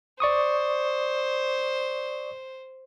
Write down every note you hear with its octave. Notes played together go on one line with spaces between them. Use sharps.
C5 D5 C#6 D#6